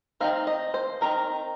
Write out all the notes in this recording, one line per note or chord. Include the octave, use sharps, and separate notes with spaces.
D#3 C4 D#4 F5
D#5
C5
D#3 C4 D#4 A#4